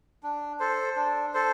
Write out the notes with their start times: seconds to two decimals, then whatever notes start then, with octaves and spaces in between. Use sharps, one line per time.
0.23 D4
0.60 A4 C5
0.96 D4
1.34 A4 C5